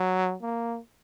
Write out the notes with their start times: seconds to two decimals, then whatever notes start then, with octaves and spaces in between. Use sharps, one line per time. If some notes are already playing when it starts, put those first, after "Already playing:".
Already playing: F#3
0.42 A#3